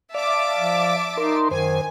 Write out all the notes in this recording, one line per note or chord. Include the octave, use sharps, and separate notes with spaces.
D5 E5 F5 A5 D6
F3
D#4 A#4 C6
F#2 D#3 C5 G#5